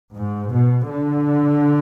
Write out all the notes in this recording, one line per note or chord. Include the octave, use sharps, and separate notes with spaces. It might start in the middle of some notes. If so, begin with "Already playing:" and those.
G#2
B2
D3